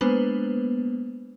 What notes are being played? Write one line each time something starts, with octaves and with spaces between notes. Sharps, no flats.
G#3 A#3 B3 D4 B4 C5